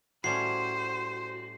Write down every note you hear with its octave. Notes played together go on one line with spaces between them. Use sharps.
A2 G3 C#4 F#4 C5 C7